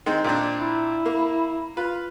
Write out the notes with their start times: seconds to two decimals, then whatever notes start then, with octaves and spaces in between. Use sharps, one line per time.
0.06 D#3 G#3 C4
0.24 A#2 C4 D4
0.59 E4
1.06 A#3
1.77 F4 B4